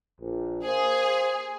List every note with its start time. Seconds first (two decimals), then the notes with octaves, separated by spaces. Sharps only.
0.19 A#1
0.63 A#3 G#4 C5